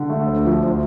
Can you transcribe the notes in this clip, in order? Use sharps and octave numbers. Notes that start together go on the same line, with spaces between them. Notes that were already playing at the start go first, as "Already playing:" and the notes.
Already playing: D3
A3
D2
F3
D2